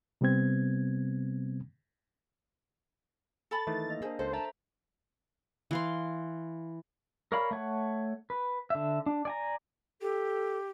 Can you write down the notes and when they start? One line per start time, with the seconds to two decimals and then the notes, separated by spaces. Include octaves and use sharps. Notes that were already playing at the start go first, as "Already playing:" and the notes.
0.21 C3 G3 B3 C4 G#6
3.51 A4 A5 B5 A6
3.67 D#3 E3 A3
3.87 A#3 D#5
4.02 D4 G#4 A#4 C5
4.19 C#2 A4 C5
4.33 C5 E5 A5 A#5
5.71 E3 F5 C6
7.32 A#4 C#5 D5 F5 B5
7.51 A3 C#5 F#5
8.30 B4
8.70 D3 E5
9.06 D4
9.25 D5 G#5 A#5
10.02 G4 A4